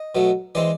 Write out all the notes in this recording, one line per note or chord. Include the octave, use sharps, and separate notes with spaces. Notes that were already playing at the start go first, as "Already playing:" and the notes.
Already playing: D#5
B2 F#3 A3
E3 G#3 C4 D5